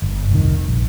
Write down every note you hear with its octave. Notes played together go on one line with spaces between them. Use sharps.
G1
F1 C2 D#3
A#1